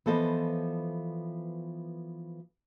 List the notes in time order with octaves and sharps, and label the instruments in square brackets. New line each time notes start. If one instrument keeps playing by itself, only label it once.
[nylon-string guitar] E3 F3 B3 A4 C5 D#5